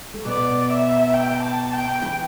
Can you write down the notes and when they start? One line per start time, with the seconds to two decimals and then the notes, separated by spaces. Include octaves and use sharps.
0.14 A3
0.25 B2 B3 D5
0.70 E5
1.13 G5
1.43 A5
1.73 G5
2.02 E3 E4